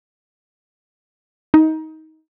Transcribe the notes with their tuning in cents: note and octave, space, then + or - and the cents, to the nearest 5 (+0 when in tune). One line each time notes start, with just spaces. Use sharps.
D#4 +20